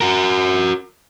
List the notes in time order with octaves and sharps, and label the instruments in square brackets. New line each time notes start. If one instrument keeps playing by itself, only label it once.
[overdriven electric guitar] F#4 A#4